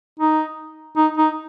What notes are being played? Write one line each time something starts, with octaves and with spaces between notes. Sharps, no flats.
D#4
D#4
D#4